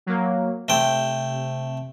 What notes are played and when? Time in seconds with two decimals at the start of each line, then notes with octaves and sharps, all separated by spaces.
0.06 F#3 A#3
0.68 C3 A3 G5